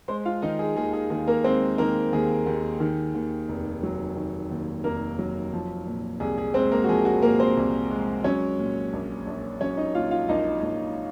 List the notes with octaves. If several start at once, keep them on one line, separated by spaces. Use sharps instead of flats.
G#3 C5 C6
F4 F5
D#3 D#4 D#5
G#4
D#2 G#4
G#4
D#2 G#4
A#3 A#4
G#3 C4 C5
D#3 A#3 A#4
D#2 G#4
D#2
D#3
D#2
F1
F#3
D#3
D#2
F1 A#3 A#4
F#3
F3
A#2
C2 G#4
G#4
G#3 C4 C5
A#3 A#4
F#4
F3 G#4
F#4
A#2 A#3 A#4
C4 C5
C2
G#3
F#3 C#4 C#5
A#2
A#1
A#1
F#3 C#4 C#5
D#4 D#5
A#2 F4 F5
F4 F5
A#1 D#4 D#5
A#1